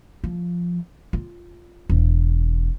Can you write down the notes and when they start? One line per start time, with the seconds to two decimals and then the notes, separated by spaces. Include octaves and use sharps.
0.24 F3
1.13 F4
1.89 E1